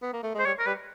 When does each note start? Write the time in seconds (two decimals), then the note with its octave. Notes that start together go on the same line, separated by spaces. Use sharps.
0.02 B3
0.13 A#3
0.23 A3
0.34 G#3 C5
0.46 G3 C#5
0.59 A#4
0.66 G3 B4